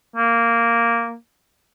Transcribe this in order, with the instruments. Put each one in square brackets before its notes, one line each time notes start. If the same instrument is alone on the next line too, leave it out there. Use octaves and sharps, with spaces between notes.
[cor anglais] A#3